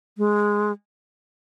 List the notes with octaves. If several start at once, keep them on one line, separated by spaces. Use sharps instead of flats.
G#3